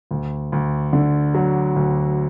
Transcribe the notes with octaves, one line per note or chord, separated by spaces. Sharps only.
D2
D2
D3
F#3
D2